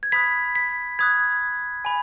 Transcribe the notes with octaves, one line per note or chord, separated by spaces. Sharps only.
G#6
B5 D#6 F#6 B6
B6
B5 D#6 F#6 G#6
G#5 B5